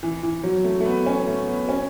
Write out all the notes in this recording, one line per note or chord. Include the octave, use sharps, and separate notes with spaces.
E3
E3
F#3
A3
A3
B3
C#4
A3
B3
C#4